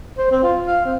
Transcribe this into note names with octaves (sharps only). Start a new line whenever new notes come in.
C5
C4
F4
F5
C4